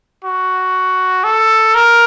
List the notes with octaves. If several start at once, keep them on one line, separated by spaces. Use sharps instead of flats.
F#4
A4
A#4